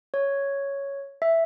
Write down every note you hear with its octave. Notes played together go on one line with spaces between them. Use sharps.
C#5
E5